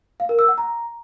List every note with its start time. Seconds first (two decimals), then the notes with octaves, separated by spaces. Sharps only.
0.20 F5
0.29 A#4
0.39 E6
0.48 F#5
0.58 A#5